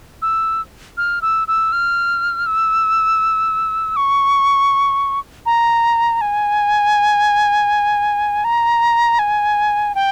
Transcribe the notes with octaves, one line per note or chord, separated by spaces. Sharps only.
E6
F6
E6
E6
F6
E6
C#6
A#5
G#5
A#5
G#5
G5